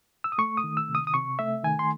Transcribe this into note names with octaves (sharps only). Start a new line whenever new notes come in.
E6
D#6
A3 C#6
D#6
D#3
E6
C3
D#6
D#6
C3 C#6
A3 E5
D#3 G#5
C6